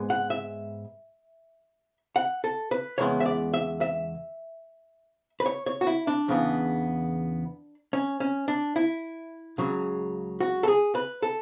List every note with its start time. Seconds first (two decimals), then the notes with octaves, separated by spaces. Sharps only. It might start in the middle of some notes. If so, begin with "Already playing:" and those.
Already playing: G#2 G#3 B3
0.10 F#5
0.30 E5
2.16 F#5
2.44 A4
2.71 B4
2.98 E2 C#3 G#3 B3 C#5
3.20 E5
3.26 D5
3.54 E5
3.81 E5
5.40 B4
5.46 C#5
5.66 C#5
5.81 F#4
5.87 E4
6.07 D4
6.28 E2 C#3 E3 B3
7.93 C#4
8.20 C#4
8.48 D4
8.76 E4
9.58 C#2 C#3 F#3
10.40 F#4
10.63 A4
10.68 G#4
10.95 B4
11.22 A4